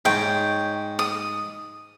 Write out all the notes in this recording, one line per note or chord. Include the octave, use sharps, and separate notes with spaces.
G#2 C#5 G5
D#6